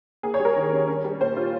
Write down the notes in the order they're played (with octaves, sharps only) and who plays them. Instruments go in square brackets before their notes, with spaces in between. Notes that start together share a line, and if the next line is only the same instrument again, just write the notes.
[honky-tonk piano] A#3 G#4
C#5
G3
A#4
D#3
C#4
C#4
G3
A#2 C5
F4